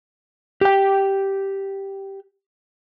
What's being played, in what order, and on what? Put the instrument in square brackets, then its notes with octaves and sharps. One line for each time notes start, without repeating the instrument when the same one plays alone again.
[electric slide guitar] G4 G5